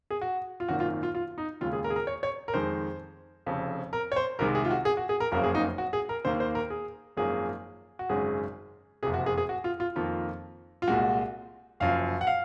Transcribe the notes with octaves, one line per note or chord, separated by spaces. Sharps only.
G#4
F#4
F4
G#1 F#2 D#3 A#3 F#4
F4
F4
F4
D#4
D#2 C#3 G#3 F4
G#4
A#4
G#4
A#4
C#5
C#5
A#4
F2 D#3 G#3 C5
F1 F2 C#3
A#4
C#5
C5
C2 C3 D#3 G#3 A#4
G#4
F4
F#4
G#4
F#4
G#4
A#4
F#1 F2 C#3 F#3 A#3 A#4
G#4
D#4
F#4
G#4
A#4
D#2 D#3 A#3 C5
C5
A#4
G#4
G#1 F#2 F3 A#3 G#4
F#4
G#1 F#2 C#3 G#3 G#4
F#1 F2 C3 G#4
F#4
G#4
G#4
F#4
F4
F4
F2 D#3 A#3 F4
F4
C2 A#2 G#3 F#4
F#1 F#2 F3 F5
F#5
F5